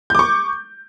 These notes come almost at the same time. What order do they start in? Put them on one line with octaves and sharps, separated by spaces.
G6 D6 C#6